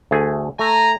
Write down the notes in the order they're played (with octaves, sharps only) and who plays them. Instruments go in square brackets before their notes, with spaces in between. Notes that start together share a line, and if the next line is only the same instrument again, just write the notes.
[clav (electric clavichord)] D2 A3 G#4
[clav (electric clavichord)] A3 [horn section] G#5 A#5